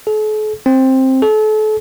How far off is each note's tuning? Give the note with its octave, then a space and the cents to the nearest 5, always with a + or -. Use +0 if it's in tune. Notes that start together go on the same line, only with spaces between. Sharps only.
A4 -45
C4 +10
A4 -35